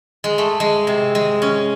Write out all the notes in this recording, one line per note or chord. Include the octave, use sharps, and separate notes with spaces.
G#3
A3
G#3
C3
G#3
C#4